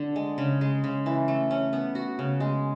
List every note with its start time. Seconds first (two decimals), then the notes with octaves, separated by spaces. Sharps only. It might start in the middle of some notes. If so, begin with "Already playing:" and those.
Already playing: D3
0.16 G#3
0.38 C#3
0.61 G#3
0.84 C#3
1.06 E3
1.28 A3
1.51 C#4
1.73 B3
1.95 F#4
2.19 C#3
2.40 G#3